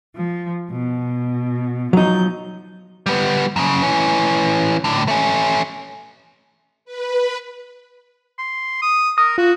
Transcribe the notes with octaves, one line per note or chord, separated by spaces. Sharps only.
F3
B2
F3 F#3 D#4 G6
G3 B3
F#2 C#3
E3 C#4
A2 D3
A3 C#4
B4
C6
D#6
A#4 D#6
F4 F#4